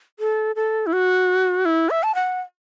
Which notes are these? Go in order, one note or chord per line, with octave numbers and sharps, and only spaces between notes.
A4
A4
E4
F#4
E4
E5
A5
F#5